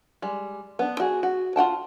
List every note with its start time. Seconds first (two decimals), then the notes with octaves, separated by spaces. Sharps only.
0.22 G3 G#3
0.79 B3 D4
1.00 F#4 G#4
1.23 F#4
1.56 F4 F#5 G5 A5